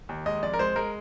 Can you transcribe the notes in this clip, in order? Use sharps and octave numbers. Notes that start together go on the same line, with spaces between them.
D#2
G#3 D#5
F2 D5
A#4
G#3 C5
G#3 A#4